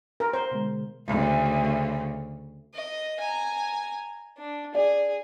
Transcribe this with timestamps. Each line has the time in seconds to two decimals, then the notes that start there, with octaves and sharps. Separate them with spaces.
0.20 A#4 C6
0.33 C5
0.51 B2 D3 G#3
1.07 D2 C#3
2.74 D#5
3.20 G#5 A#5
4.37 D4
4.74 G#4 D5